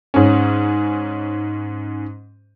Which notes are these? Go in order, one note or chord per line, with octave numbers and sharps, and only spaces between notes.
G#2 C#4